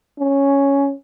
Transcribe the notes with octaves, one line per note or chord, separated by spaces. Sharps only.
C#4